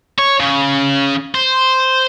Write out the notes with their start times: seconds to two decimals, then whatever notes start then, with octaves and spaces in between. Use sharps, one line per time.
0.18 C#5
0.40 C#3
1.35 C5